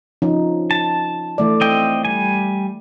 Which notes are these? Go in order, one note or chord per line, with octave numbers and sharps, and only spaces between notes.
F3 C#4 D#4
A5
E3 A3 D5
C4 D#5 G5
G3 G#5